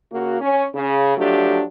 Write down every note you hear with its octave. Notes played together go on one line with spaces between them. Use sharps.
C#3 A#3 F#4
C#4
C#3
F3 F#3 A3 D4 G4